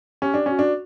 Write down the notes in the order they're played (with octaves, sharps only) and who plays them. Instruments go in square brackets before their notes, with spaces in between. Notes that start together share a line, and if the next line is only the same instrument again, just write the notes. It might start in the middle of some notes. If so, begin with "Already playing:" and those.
[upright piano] C#4 [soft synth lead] G4
[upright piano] D4
[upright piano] C#4 [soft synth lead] F#4
[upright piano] D4